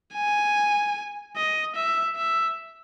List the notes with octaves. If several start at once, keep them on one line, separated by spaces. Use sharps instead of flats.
G#5
D#5
E5
E5